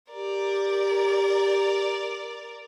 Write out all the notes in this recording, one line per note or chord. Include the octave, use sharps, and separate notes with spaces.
G4 A#4 D5